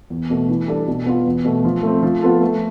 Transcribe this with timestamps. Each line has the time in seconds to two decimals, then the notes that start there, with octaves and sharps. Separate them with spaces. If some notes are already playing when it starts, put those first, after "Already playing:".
0.10 E2
0.30 B2 A3
0.49 E3
0.68 G3 D4 A4 D5
0.87 B2
1.06 B3 F4
1.26 E2
1.45 B2 A3
1.65 F3
1.83 A3 C4
2.03 F3
2.22 B3 F4 A4
2.41 A3